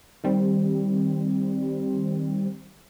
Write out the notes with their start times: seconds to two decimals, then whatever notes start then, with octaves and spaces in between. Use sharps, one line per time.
0.24 D#3 G3 C4